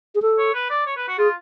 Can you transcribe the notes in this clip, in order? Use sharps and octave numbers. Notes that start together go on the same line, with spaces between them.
G#4
A4
C#5
B4
D5
C#5
B4
F#4
F4 G#4